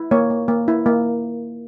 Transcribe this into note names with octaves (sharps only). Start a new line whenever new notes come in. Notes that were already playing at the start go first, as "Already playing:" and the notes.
Already playing: E4
A#3 C#5
A#3
A#3
E4
A#3